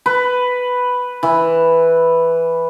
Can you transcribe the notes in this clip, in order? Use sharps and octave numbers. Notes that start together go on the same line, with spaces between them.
B4
E3